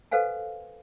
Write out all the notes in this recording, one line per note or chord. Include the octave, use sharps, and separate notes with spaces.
A4 B4 C5 F5 F#5 G#5